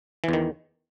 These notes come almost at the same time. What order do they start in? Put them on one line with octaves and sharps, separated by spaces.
E3 E2 D#3